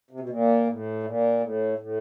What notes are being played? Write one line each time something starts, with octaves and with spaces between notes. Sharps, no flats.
C3
B2
A#2
A2
A#2
A2
A2